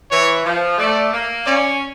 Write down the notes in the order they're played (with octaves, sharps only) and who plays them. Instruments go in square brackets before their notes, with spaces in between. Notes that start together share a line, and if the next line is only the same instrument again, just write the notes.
[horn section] E3 [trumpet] C#5
[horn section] F3
[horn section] A3 [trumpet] D5
[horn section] A#3
[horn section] C#4 [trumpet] D5